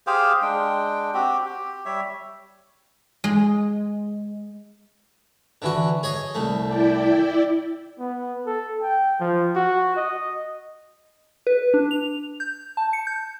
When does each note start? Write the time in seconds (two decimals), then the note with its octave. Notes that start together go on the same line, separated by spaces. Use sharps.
0.07 G4 G#4 C5 F5
0.42 G#3 D4 G5
1.14 C4 F#4 G4
1.45 G4
1.85 G3 C#5 E5
3.24 G#3
5.62 D3 E3 F#4
6.03 G#4 C#5 D#5
6.35 C2 A3
6.66 E4 D5 G5
7.99 B3
8.46 A4
8.82 G5
9.20 F3
9.55 F#4
9.96 D#5
11.47 B4
11.74 D4
11.91 F7
12.40 G6
12.77 A5
12.93 C#7
13.07 G6